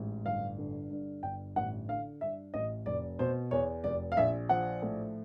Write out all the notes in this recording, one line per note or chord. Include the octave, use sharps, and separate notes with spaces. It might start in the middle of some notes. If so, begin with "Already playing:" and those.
Already playing: A1 G#2
G1 F5
D3
G2
G1 G5
A1 F#5
D3 F5
G2 E5
A1 D#5
F1 D5
B2 C5
E2 C#5
F1 D5
F5
A#1 E5
F3 F#5
A2